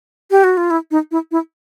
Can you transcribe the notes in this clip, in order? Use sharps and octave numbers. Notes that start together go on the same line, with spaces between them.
G4
F#4
F4
E4
D#4
E4
E4